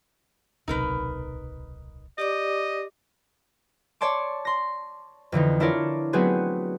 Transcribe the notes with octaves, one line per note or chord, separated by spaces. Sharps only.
D1 B1 C3 D#4 A#4 B4
G4 D5 D#5 D6
C#5 D5 A5 C6 D6
C6 A#6
F2 D3 E3 D#4
D4 E4 F4 A#4 C#5 D5
F#3 A3 B3 C4 F#4 G#4